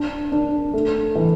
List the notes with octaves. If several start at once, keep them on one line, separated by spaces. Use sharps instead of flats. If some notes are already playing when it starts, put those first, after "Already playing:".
Already playing: D4
D4
A3
E3